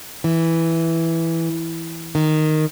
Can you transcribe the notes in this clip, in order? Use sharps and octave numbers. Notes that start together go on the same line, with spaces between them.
E3
D#3